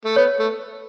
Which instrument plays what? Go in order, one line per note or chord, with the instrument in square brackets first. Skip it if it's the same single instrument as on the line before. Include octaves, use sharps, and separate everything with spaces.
[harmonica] A3
[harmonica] B3 [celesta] C#5
[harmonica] A3